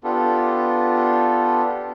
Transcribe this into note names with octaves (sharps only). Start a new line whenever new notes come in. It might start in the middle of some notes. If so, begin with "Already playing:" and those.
B3 D4 F4 G4 A4